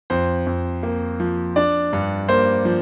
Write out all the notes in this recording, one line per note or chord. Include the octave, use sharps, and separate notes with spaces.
F2 C5
F2
A#3
F3
D4 D5
G2
A#3 C5
F3